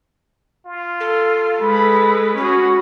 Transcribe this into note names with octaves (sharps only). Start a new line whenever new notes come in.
F4
A4 C6
G#3 B4 B5
C#4 F#4 G#4 B5